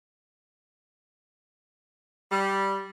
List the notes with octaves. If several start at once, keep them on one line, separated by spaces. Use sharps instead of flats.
G3